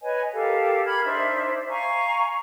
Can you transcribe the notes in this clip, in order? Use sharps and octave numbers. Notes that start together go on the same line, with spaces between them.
B4 C#5 D#5 G#5
G4 A4 A#4 F5
A#4 B5 F6 G#6
D4 D#4 C5 E5
F5 G#5 A#5 C#6